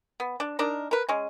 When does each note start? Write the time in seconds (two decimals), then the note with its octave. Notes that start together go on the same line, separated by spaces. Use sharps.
0.20 B3
0.40 D4
0.59 D4 D#4 A#4
0.91 A#4 B4
1.09 G#3 C#4